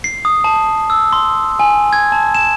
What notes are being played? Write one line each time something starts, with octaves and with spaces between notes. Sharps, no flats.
C7
D#6
A5
E6
C6
G#5
G#6
A5
E7